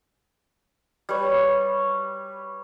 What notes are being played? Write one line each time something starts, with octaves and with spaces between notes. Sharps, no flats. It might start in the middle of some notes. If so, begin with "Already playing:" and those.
G3 B4 C#5